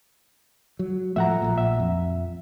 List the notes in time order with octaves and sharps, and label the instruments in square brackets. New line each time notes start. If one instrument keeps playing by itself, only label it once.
[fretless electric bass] F#3
[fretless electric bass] A2 F3 A3 [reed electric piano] E5 F#5 A#5
[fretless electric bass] A#1 A#2
[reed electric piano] E5
[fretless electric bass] F2